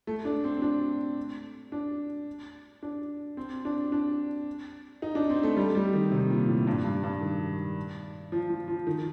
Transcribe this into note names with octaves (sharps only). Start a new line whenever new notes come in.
A3
D4
C4
D4
D4
D4
C4
D4
D4
D#4
D4
C4
A3
G3
G3
D#3
C3
A#2
A2
G2
G2
G2
D#3
F3
F3
F3
D#3